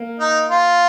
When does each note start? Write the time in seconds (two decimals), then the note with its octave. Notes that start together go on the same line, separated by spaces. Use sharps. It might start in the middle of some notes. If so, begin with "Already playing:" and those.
Already playing: A#3
0.20 D#4
0.50 F4